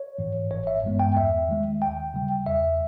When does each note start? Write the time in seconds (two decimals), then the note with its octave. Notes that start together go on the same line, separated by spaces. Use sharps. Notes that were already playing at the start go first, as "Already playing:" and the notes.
Already playing: C#5
0.18 G#2 E3
0.51 G1 C#5
0.67 E5
0.83 G2 E3 G#3 B3
0.99 G5
1.16 E2 E5
1.49 D#3 G#3
1.81 D#2 G5
2.14 C#3 G3
2.46 E2 E5